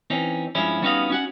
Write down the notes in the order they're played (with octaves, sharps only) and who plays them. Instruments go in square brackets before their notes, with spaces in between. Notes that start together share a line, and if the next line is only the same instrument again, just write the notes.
[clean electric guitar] E3 C4 C#4 D#4
G2 F3 G#3 C#4 E4
G3 B3 C#4 D#4 F#4 F5
C#4 F#4 F#5